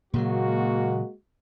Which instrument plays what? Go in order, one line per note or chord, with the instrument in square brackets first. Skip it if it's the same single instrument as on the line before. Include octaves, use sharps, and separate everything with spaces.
[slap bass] A#2 C#3 F#3 [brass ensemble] G#3 A#3 F#4